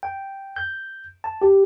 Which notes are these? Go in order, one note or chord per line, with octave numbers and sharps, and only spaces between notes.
G5
G6
A5
G4